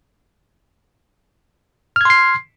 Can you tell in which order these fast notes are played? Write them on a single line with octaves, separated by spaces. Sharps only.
F6 G#6 C6 C7